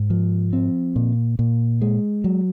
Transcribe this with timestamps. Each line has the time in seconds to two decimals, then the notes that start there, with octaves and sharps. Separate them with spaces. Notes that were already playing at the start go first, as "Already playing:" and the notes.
Already playing: G#2
0.10 F3
0.53 C4
0.96 A#2
1.39 A#2
1.82 G#3
2.24 F#3